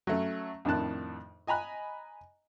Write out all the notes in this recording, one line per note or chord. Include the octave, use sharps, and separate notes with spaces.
F#3 A3 C#4
F2 A2 D#3 D4 A5 F#6
D#5 G#5 A#5 B5 F#6